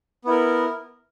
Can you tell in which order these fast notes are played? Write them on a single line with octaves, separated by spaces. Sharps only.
B3 E4 A#4